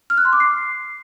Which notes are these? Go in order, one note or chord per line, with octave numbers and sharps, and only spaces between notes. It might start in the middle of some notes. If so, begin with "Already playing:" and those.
F6
F#6
C6
D6
C7